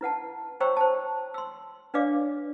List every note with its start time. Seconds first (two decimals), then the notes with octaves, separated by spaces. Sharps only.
0.01 E4 B4 F#5 A5
0.60 C5 C#5 G5 A#5 C#6 E6
0.77 C5 A5
1.34 C6 E6
1.94 D4 B4 C#5 D5 F5 D6